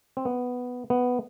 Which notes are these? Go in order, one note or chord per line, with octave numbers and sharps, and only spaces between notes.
C4
B3
B3